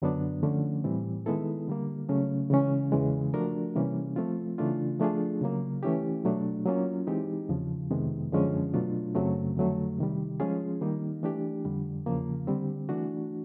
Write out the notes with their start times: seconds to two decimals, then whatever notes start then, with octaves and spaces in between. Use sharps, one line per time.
0.02 F#2 D3 F#3 B3 D4
0.43 D3 F3 A3 C#4
0.84 A2 E3 G3 C4
1.26 D#3 G#3 B3 E4 A4
1.68 D3 G3 A#3
2.09 C#3 F#3 A3 C#4
2.50 C#3 E3 G#3 C#4
2.92 E2 C#3 E3 G#3
3.34 F3 A3 D4 F#4 A#4
3.75 C3 E3 G3 A#3 C#4
4.16 F3 A3 C4 F4
4.58 C#3 E3 A3 D4 F4
5.00 F3 A3 D4 F4 G#4
5.41 C#3 F#3 A#3
5.83 E3 A3 C#4 E4 G4
6.24 B2 F#3 A3 D4
6.66 F#3 A#3 C#4 F4
7.07 E3 G#3 C4 D#4 G4
7.49 E2 C#3 F3
7.91 F2 C3 D#3 G#3 B3
8.32 F#2 D3 F3 G#3 C#4
8.74 B2 F#3 A3 D4 F4
9.15 F#2 C#3 F#3 A3 C4
9.56 F2 D3 F#3 A3
9.98 C3 D#3 G3
10.40 F3 G#3 C#4 F4 G#4
10.81 D#3 G3 A#3 D#4
11.23 E3 A3 D4 G4
11.65 F2 D3 G3
12.06 E2 C#3 F3 A#3
12.47 D3 G3 C4
12.89 E3 A3 D4 F#4